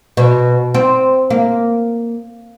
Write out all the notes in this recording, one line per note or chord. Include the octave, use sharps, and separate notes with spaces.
B2
C4
A#3